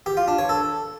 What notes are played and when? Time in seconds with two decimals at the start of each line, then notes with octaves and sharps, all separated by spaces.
0.06 G4
0.17 F4
0.28 D4
0.38 C#5
0.49 A4